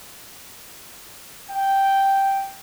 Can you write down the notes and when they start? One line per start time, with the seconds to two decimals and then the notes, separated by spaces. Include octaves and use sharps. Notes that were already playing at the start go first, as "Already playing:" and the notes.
1.51 G5